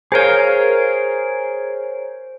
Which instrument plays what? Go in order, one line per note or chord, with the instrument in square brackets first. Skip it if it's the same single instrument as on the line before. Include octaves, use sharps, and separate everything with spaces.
[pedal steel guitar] G#4 A#4 F5 [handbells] C5 C#5